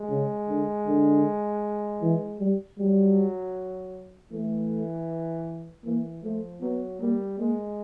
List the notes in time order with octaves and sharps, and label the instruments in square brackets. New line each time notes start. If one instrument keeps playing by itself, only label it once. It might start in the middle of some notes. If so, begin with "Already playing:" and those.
Already playing: [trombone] G#3
[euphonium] C#3
D3
D3
E3
G3
[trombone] F#3 [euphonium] G3
[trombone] E3 [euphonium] A3
[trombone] E3 [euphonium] A#3
[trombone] F3 [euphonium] A3
[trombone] F#3 [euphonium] B3
[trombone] G3 [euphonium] A#3
[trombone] G#3 [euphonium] A#3